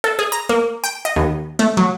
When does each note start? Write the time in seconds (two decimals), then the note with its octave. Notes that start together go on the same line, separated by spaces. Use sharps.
0.04 A4
0.19 G#4
0.32 A#5
0.49 A#3
0.84 G5
1.05 D#5
1.16 D#2
1.59 A3
1.77 F#3